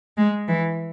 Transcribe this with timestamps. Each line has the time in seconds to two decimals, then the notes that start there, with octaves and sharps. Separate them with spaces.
0.17 G#3
0.48 E3